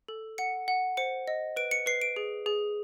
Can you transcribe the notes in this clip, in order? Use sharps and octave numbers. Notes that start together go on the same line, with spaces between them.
A4
F#5 C#7
F#5
C5 C#7
D#5
B4 D7
C#7
B4 C7
D7
G#4
G#4